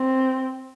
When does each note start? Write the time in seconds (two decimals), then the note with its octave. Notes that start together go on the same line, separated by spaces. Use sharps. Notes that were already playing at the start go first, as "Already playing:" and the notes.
Already playing: C4